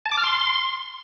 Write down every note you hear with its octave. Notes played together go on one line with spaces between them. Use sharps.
A5
D6
F6
C6